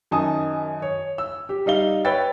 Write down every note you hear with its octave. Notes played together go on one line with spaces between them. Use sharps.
F#2 D#3 D#4 G#5 A5 D#6
C#5
E6
G4
G3 D#4 F5 G7
B4 C#5 G5 E6 A6